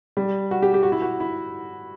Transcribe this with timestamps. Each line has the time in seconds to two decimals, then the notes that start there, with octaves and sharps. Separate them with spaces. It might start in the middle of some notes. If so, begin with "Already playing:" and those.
0.17 G3
0.51 F#4
0.62 G4
0.74 G4
0.83 F#4
0.92 E4
1.02 F#4
1.20 E4